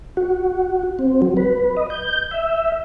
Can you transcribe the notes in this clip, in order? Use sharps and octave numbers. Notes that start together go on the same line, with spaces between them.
F#4
C4
F#3
B4
D#5
G6
E5